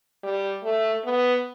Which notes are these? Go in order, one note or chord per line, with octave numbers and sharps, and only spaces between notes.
G3
A3
B3